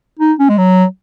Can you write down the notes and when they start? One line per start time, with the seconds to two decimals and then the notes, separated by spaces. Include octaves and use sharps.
0.19 D#4
0.39 C#4
0.49 G#3
0.58 F#3